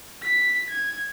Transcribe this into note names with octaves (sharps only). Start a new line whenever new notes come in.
B6
G#6